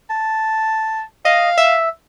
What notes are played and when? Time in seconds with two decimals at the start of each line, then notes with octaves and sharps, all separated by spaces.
0.10 A5
1.25 D#5 F5
1.58 E5